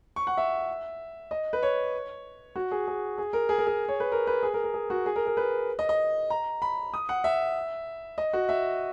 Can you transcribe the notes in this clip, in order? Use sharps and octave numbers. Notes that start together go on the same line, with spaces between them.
C#6
F#5
E5
D#5
B4
C#5
F#4
G#4
G#4
G#4
A#4
G#4
A#4
G#4
C#5
B4
A#4
B4
G#4
A#4
A#4
G#4
F#4
G#4
A#4
A#4
B4
D#5
D#5
A#5
B5
D#6
F#5
E5
D#5
F#4
E5